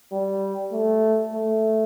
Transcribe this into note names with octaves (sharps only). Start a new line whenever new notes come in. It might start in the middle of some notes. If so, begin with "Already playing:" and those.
G3
A3
A3